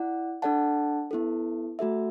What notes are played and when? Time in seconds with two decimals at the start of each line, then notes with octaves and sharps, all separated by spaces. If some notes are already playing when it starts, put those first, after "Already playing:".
Already playing: E4 D5 F#5
0.42 D4 A4 D5 F#5 A5
1.11 B3 E4 A4
1.79 A3 F#4 A4 E5